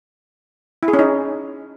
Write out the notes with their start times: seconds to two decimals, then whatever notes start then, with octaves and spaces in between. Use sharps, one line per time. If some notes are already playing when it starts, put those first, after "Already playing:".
0.83 E4
0.88 G#4
0.93 C#4
0.99 D#4